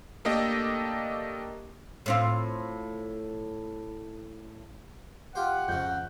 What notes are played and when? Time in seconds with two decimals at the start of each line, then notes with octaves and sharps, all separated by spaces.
0.25 A3 A#3 D4 G4 A4 D#5
2.06 A2 C4 F4
5.35 F4 G4 C5 F#5
5.68 F2 G#2 C#3 F3 G6